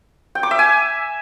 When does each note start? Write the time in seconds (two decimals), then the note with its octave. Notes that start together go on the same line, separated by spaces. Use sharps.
0.35 G5
0.43 D6
0.51 E5
0.59 G#5